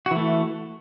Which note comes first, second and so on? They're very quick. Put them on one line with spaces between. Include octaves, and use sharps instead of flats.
F#4 E3 A3